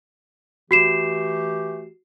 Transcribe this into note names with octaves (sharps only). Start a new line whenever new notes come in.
E3 A3 F#4 G4 C7 E7